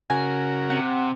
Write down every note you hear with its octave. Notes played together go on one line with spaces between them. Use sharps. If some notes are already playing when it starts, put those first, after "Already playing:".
C#3 F#4 A#4 G#5
C3 F#5